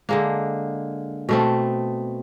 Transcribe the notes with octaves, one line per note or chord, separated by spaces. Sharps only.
D3 G#3 A#3
B2 A3 C4